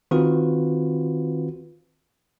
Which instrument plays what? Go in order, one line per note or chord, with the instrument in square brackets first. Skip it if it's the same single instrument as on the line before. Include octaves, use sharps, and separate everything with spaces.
[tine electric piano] D#3 C4 F4 F#4 B4